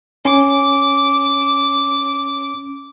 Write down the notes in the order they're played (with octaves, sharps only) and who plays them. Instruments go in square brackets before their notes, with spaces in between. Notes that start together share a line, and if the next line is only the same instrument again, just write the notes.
[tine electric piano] C#4 [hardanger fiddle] D6